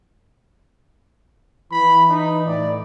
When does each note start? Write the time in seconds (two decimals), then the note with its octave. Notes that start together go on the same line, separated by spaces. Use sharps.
1.72 E3 B5
2.10 D#4
2.47 A2 D5